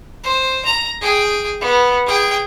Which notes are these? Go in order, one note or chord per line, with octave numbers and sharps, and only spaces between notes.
C5
A#5
G#4 G5
B3
G#4 G5